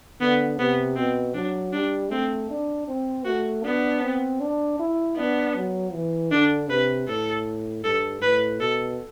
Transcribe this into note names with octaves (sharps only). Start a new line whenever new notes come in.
D3 B3
C3 B3
B2 C4
F#3 D4
G3 D4
A3 C4
D4
C4
A3 F#4
B3 D4
C4
D4
E4
B3 D4
F#3
E3
D3 D4
C3 B4
A2 A4
G2 A4
A2 B4
B2 A4